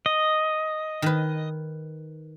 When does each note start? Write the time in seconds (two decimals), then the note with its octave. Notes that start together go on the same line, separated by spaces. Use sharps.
0.06 D#5
1.02 D#3 B4